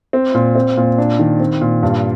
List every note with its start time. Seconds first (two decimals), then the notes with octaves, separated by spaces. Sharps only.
0.13 C4
0.34 A#2
0.55 C4
0.77 A#2
0.98 D4
1.19 D#3
1.40 C4
1.61 A#2
1.83 G2